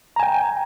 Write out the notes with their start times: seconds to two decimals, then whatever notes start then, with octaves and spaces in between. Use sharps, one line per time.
0.16 A#5
0.20 G#5
0.23 G5